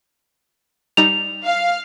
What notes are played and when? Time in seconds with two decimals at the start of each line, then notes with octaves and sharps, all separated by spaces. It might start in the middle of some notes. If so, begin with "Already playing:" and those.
0.97 G3 D#4 F7
1.45 F5